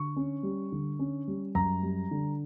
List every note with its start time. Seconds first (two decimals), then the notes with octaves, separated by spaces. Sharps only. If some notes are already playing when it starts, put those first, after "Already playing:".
Already playing: D3 C#6
0.16 C#4
0.43 G3
0.72 D3
0.99 C#4
1.28 G3
1.55 F#2 A#5
1.83 G3
2.11 D3